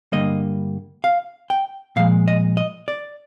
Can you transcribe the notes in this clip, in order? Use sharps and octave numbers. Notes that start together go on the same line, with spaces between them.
G2 D3 G3 A#3 D#5
F5
G5
A#2 F3 G#3 F5
D#5
D#5
D5